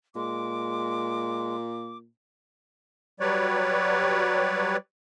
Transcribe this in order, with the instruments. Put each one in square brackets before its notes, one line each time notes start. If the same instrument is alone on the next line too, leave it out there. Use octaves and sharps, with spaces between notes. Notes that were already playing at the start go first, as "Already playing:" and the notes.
[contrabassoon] A#2 [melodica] G#3 [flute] D6
[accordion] F#3 G3 B4 C#5 D5